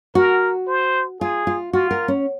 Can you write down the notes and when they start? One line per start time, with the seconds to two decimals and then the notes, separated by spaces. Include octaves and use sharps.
0.15 F#4 A#4
0.68 C5
1.20 F4 G#4
1.47 F4
1.73 F4 F#4
1.91 A#4
2.08 C#4